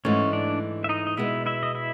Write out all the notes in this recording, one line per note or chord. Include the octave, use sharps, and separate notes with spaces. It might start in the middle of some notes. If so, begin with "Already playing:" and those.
G#2 E3 A3 C#4 C#5
D4 D5
E5
D#4 D#5
D#5
B2 G#3 B3 E4 E5
E4 E5
D#5
E4 E5